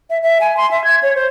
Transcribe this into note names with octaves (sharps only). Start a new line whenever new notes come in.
E5
E5
G#5
C6
E5
G#6
C#5
C5